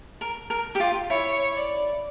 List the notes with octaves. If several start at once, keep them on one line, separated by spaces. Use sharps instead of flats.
A#4
A#4
G4
F4
E4 C#5
D5